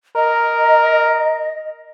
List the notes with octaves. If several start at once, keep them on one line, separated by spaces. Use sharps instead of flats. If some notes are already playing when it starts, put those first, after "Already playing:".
A#4 D#5